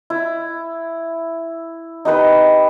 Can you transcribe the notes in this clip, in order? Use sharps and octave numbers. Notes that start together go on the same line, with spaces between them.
E4
D#4 G4 B4 B5